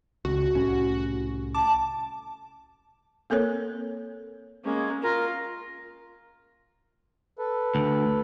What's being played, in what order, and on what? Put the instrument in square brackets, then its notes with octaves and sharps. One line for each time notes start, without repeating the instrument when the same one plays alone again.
[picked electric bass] C#2 [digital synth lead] F#4
[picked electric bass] C2 A2 C#4
[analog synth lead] A5 [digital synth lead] D6
[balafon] A#3 C4 A4 A#4 C#5
[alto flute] G#3 [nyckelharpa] A#3 C#4
[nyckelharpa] F4 [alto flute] A#4
[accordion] A4 B4
[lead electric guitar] D2